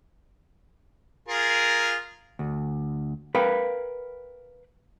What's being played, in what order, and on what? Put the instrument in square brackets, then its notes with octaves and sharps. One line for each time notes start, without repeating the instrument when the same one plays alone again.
[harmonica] F4 G#4 A#4
[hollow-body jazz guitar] D2
A#4 B4 F5 G5 B5